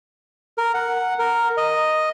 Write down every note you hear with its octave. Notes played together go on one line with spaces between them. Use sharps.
A#4
F#5
A#4
D#5